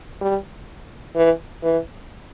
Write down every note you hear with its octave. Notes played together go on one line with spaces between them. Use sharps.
G3
E3
E3